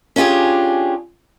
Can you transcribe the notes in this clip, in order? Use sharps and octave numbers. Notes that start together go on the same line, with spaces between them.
C#4 D4 F4 G4 G#4